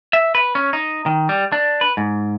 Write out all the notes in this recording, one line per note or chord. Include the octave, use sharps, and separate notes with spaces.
E5
B4
C#4
D#4
D#3
G3
D4
B4
G#2